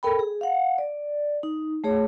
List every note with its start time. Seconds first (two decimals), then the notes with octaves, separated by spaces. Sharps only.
0.03 A4 A#4 G5 B5
0.19 G#4
0.41 F5 F#5
0.78 D5
1.43 D#4
1.84 A3 G#4 C#5